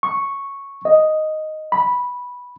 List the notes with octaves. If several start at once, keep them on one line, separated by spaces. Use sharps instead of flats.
C#6
D#5
B5